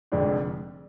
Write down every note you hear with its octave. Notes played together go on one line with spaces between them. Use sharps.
F1 F2 D3 G#3 D4